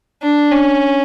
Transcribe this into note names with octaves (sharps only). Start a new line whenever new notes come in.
D4
C#4